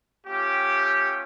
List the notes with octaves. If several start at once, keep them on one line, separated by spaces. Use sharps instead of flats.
A3 C#4 F4 G4